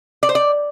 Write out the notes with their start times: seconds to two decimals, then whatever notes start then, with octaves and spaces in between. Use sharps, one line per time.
0.23 D5
0.29 C5
0.35 D5